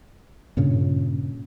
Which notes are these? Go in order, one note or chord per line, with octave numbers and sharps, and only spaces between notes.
G2 A#2 C#3